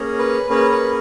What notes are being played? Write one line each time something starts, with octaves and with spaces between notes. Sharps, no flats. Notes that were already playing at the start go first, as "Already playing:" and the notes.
Already playing: A#3 C#4 G#4
B4
A#3 C#4 G#4 B4
B4